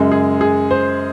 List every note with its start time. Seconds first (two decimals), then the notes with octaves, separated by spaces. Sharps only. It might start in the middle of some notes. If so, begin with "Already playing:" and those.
Already playing: F#2 C#3 G#3
0.12 G#4
0.41 G#4
0.71 C5